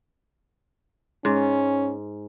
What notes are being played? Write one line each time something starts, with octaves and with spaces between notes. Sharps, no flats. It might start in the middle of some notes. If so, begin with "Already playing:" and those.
G#2 C#4